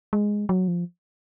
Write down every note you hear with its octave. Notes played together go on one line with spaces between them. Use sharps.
G#3
F#3
F3